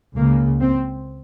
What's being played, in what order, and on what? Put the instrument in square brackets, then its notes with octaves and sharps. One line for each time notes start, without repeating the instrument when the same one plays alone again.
[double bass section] C#2 C#3 A#3
C4